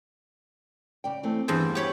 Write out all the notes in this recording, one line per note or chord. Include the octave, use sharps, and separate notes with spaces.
C#3 D5 G5
E3 A3 C4
E2 G2 E4 C5 A5
G4 C#5 B5